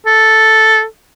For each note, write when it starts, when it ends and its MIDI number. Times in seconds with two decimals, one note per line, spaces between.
0.06 0.84 69